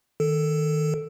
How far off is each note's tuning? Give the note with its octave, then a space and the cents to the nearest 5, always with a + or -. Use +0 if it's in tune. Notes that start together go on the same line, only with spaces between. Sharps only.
D#3 +0 A4 +0